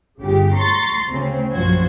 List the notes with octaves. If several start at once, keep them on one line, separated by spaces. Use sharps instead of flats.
G1 C#3 G4
A#5 C6 C#6 A6
D2 C#3 C4 C#4
A#1 F#2 F3 F#4 C5 G#6